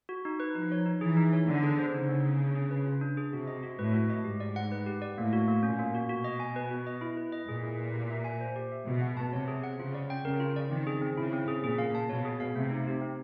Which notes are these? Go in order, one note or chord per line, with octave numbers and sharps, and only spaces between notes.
F#4
D#4
B4
F3 D#4
C#5
D#4
E3 G#4
D#4
C#5
D3 B3
G#4
C5
C#3 D#4
B3
G#4
D4
G#4
B4
F4
D4
G#4
C3 F#4
D#5
F#4
A2 B4
F#4
D#5
G#2 G4
D5
F#5
B4
G4
D5
A2 A#3
F#4
A#3
A#2 C#4
A#3
F#4
B2 F#4
D#5
G#5
B4
F#4
D#5
E4
B4
D#5
A#2 G#4
E4
B4
G4
E5
G#5
C5
G4
E5
B2 G#4
F#5
A5
C3 C#5
G#4
F#5
C#3 F4
D5
G5
C#3 A#4
F4
D5
D#3 C4
G#4
C4
C#3 E4
C4
G#4
A#2 G#4
F5
A5
B2 C#5
G#4
F5
C3 A3
D#4
G4
C4